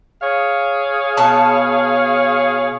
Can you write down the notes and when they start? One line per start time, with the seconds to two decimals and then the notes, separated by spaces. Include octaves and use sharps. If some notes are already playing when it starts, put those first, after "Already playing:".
0.22 G#4 C#5 F5
1.17 B2 A5